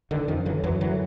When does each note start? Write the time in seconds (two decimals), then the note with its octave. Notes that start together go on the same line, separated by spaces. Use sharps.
0.11 D3 D#3
0.28 F#2 D#3 F3
0.46 D3 E3 F#3
0.64 F#2 E3 F#3
0.81 D3 E3 F#3